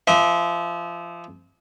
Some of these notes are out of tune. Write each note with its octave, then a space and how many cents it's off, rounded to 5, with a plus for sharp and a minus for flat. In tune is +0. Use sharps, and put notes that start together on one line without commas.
F3 -25 E5 -40